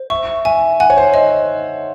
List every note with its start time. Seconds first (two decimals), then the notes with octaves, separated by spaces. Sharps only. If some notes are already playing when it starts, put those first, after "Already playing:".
Already playing: C5
0.10 E5 C#6
0.45 E5 G#5
0.80 F#5 G#5
0.90 C#5
0.97 C5
1.14 C5 D#5